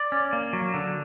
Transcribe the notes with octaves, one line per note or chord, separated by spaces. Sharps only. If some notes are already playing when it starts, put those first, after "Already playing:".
Already playing: D5
C#4
A#3
F#3
D3